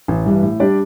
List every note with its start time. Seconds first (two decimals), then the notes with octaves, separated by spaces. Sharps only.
0.08 A1
0.26 G2 E3 G3
0.43 A2
0.60 G3 D4 G4 D5